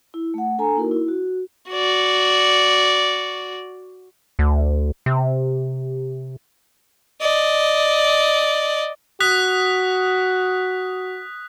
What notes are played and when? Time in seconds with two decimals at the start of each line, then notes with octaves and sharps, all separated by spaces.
0.14 E4
0.34 A3 F#5
0.58 D4 A4 G#5 A#5
0.76 A#3 D#4 E4 F#4 A#4
0.91 E4
1.08 F#4
1.70 F#4 D5
4.39 D2
5.06 C3
7.21 D5 D#5
9.20 F#4 D#6 F#6 B6